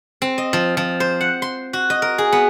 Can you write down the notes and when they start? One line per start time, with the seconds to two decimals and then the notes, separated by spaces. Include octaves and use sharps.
0.22 C4
0.38 D#5
0.53 F3
0.77 F3
1.00 C5
1.21 F#5
1.42 C6
1.73 F#4
1.90 D#5
2.02 A#4
2.18 G#4
2.32 B3